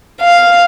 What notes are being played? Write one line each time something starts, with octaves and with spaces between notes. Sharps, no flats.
F5